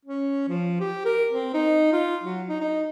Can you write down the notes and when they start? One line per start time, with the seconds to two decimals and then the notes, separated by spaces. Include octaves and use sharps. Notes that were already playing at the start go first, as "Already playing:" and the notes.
0.05 C#4
0.48 F3
0.80 G4
1.05 A#4
1.31 C4
1.54 D#4
1.92 F4
2.23 F#3
2.48 D#4
2.61 D#4